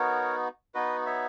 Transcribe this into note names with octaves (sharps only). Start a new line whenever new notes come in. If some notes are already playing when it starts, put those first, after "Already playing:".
Already playing: B3 D#4 F#4 A#4 C#5
B3 D#4 F#4 B4 D#5
C#5 E5